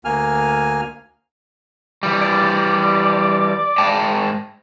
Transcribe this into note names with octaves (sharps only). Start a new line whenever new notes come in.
D2 A#3 G#5 F6
E3 G3
D5
G#2 G5 A5